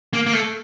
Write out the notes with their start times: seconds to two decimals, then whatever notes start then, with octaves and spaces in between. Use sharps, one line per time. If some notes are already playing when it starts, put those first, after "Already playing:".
0.13 A#3
0.26 A#3
0.33 A3